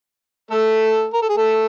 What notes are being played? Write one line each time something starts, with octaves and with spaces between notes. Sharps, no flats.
A3 A4
A#4
A4
G#4
A3 A4